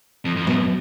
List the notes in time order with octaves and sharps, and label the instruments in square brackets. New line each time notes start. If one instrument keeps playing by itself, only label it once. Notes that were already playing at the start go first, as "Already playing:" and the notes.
[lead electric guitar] F2
F2
[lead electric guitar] F#2 [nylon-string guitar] B2